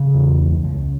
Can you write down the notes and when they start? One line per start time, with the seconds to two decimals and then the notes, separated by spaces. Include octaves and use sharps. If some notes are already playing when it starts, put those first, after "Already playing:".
Already playing: C#3
0.15 E2
0.40 C#2
0.64 C#2